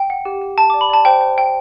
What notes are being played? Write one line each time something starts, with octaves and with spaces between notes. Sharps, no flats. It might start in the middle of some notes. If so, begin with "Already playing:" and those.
Already playing: G5
F#5
G4
G4
G4 A5
D6
D5
B5
D5 A5
C5 G5
C5
G5